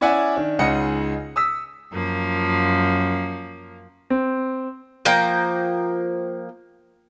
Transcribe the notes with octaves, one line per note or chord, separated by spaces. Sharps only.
C#4 E4 D5 E5 F#5 G#5
D#3 D4
C#2 C#3 D#4 D#5 F#5 C#7
D#6 E6 B6
F#2 F3 A#3
C4
F3 A#3 G5 A#5